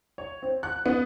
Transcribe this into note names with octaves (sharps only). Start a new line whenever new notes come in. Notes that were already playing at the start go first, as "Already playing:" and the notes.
C#5
C4
F#6
B3